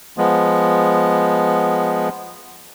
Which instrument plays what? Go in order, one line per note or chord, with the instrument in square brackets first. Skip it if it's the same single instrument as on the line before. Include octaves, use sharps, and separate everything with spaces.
[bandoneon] F3 G#3 B3